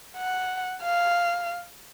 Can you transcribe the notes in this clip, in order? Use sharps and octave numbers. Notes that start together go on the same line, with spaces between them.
F#5
F5